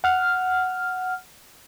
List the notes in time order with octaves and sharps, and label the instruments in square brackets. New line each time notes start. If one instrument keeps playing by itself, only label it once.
[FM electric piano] F#5 F6